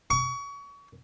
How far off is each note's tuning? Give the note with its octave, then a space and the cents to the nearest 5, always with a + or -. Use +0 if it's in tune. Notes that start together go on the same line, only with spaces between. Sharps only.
C#6 +30